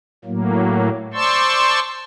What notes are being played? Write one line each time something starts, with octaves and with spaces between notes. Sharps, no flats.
A2 F#3 A#3
C5 D5 A5 C6 C#6 E6